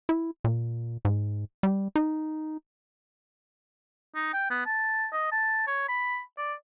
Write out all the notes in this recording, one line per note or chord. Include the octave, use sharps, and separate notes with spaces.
E4
A#2
G#2
G3
D#4
D#4
G5
B3
A5
D#5
A5
C#5
B5
D5